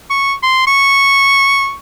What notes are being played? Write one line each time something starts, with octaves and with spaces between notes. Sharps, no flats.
C#6
C6
C#6